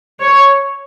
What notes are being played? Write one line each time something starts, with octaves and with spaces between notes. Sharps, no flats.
C#5